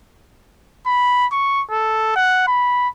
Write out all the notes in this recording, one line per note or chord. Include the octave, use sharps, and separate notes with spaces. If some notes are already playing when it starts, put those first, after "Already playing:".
B5
C#6
A4
F#5
B5